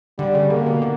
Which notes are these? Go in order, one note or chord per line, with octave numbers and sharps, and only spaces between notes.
D3 G3
C#3
D3 A#3
B2
D3